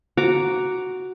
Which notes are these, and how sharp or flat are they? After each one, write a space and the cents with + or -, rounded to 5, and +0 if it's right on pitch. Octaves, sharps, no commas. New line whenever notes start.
F#4 +0 A#5 +0 D6 -10